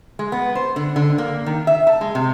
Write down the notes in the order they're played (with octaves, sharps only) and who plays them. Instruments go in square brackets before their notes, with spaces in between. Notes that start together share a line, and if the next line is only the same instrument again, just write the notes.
[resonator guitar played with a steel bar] G#3
B3
C5
D3
D3
A#3
D#3
E5
A5
G#3
C3